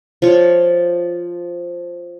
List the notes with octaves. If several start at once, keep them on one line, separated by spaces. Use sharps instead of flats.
F3 C#5